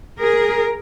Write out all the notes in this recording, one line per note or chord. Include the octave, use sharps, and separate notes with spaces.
G#4 A#4